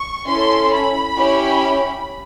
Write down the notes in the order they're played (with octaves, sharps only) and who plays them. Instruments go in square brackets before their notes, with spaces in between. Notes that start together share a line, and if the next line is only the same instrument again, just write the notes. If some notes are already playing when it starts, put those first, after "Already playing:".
Already playing: [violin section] C#6
C#4 E4 A4 C6
B5
C#4 E4 G4